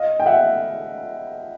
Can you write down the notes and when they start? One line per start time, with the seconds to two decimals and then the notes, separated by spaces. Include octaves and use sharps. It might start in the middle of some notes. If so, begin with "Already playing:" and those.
Already playing: D#5 F5
0.20 G5
0.26 E5 F#5